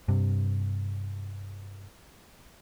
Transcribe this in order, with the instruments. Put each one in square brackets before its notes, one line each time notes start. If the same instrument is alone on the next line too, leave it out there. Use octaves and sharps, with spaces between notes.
[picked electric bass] G2 C3